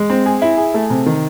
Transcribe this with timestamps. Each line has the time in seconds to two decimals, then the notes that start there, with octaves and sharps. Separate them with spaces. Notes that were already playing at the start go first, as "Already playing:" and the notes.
Already playing: G#3
0.10 C4
0.26 G#4
0.42 E4
0.57 G#4
0.74 A3
0.90 C3
1.06 D#3